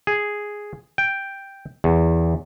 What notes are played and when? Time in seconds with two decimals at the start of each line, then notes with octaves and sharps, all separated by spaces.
0.07 G#4
0.98 G5
1.84 E2